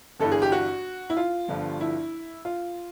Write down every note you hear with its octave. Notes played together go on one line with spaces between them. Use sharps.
G1 G2 E3 A4
G#4
G4
F#4
E4
F4
G1 G2 D3 F3
E4
F4